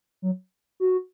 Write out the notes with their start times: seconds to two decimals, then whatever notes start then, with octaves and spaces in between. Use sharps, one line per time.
0.22 F#3
0.80 F#4